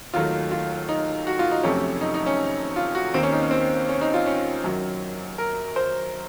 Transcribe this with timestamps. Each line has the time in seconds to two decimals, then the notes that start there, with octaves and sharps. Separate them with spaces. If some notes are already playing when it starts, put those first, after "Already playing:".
0.14 D#2 D#3 F#3 A3 F4
0.51 F4
0.89 D#4
1.27 F#4
1.39 F4
1.51 D#4
1.63 F1 F2 C3 F#3 A3 C#4
2.01 D#4
2.14 D#4
2.26 C#4
2.76 F4
2.95 F#4
3.14 D#2 D#3 A#3 C4
3.23 C#4
3.32 D#4
3.42 C#4
3.51 C4
3.89 C#4
4.01 D#4
4.14 F4
4.26 C#4
4.64 F#2 D#3 F#3
5.38 A#4
5.76 C5